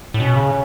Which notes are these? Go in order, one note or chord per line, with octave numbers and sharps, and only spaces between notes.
A2
B2 C#4
C#3